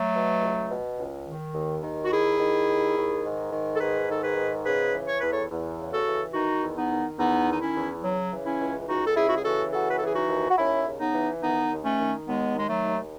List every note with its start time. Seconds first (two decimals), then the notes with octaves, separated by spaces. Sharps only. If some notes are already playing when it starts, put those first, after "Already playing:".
Already playing: F#3 A3
0.14 B2
0.41 C#2
0.70 B2
0.98 C#2
1.27 D#3
1.54 D#2
1.82 D#3
2.05 F#4
2.11 D#2 E4 G#4
2.39 D#3
2.67 D#2
2.96 D#3
3.25 G#2
3.52 D#3
3.75 A4
3.80 G#2 G#4 B4
4.08 D#3 A4
4.22 G#4 B4
4.37 G#2
4.65 C#3 G#4 B4
4.93 E3
5.08 C#5
5.20 E2 B4
5.31 A4 C#5
5.50 E2
5.78 C#3
5.92 F#4 A4
6.05 E3
6.34 D#3 D#4 F#4
6.63 E2
6.76 B3 D#4
6.91 D#3
7.19 E2 B3 D#4
7.46 D#3 D#4
7.61 C#4 E4
7.76 E2
8.03 C#3 F#3
8.31 E3
8.45 C#4 E4
8.60 C#2
8.88 C#2 D#4 F#4
9.07 A4
9.16 C#3 E4 G#4
9.29 F#4
9.37 G#4
9.44 E3 F#4 A4
9.72 C#3 F#4 A4
9.89 B4
9.97 A4
10.01 E3 G#4
10.15 D#4 F#4
10.29 D#2
10.49 F#4
10.57 D#2 C#4 E4
10.86 C#3
10.99 B3 D#4
11.13 E3
11.41 D#3 B3 D#4
11.70 D#2
11.84 A3 C#4
11.98 D#3
12.26 D#2 G#3 B3
12.54 D#3 G#3
12.69 F#3 A3
12.83 D#2